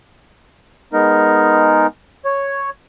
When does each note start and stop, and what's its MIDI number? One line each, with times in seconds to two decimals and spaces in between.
0.93 1.87 56
0.93 1.87 59
0.93 1.87 63
0.93 1.87 70
2.25 2.70 73